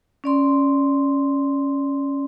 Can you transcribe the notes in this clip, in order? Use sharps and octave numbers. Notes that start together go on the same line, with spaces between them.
C#4 D5 C6